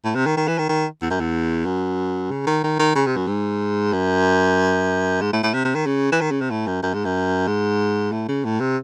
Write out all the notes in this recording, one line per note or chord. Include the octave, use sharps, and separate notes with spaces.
A2
C3
D#3
D#3
E3
D#3
D#3
E2
F#2
E2
F#2
C#3
D#3
D#3
D#3
C#3
C3
F#2
G#2
F#2
G#2
A2
A2
C3
C3
D#3
C#3
E3
D#3
C#3
C3
A2
F#2
F#2
G#2
F#2
G#2
A2
C#3
A2
C3